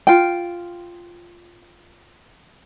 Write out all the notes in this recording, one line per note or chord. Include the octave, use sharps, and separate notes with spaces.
F4 G5